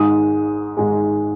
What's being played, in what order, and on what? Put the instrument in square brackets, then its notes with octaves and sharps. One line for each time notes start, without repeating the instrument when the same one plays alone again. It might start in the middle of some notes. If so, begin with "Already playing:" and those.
Already playing: [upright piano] G#1 G#2 G#3 D#6
G#1 G#2 G#3